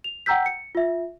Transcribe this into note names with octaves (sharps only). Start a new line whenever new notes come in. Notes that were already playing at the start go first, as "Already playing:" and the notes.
F7
F#5 G5 A#5 E6 G6 B6
C#7
F4 E5